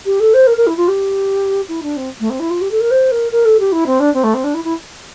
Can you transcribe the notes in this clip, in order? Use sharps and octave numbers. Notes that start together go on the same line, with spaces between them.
G4
A4
C5
A#4
A#4
E4
F4
G4
E4
D4
C4
A3
C4
E4
F4
G4
A4
A#4
C5
A#4
A#4
A4
G4
E4
C4
D4
C4
A3
C4
D4
E4
E4